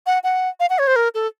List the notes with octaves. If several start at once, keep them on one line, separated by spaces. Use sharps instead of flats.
F#5
F#5
F5
F#5
C#5
C5
A#4
A4